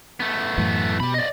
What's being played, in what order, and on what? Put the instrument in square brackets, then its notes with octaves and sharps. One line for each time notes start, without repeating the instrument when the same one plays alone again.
[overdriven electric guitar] A3 B3
[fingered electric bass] F#2 A2 E3
[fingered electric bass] B2 [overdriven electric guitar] G4 B5
[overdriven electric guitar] D5 D#5